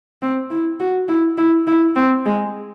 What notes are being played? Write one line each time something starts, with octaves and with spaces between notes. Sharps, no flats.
C4
E4
F#4
E4
E4
E4
C4
G#3